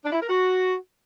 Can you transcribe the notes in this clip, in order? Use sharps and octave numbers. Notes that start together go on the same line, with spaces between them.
D4
E4
A#4
F#4